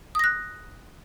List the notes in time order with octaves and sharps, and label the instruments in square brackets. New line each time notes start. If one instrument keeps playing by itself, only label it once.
[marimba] D#6
A#6
F#6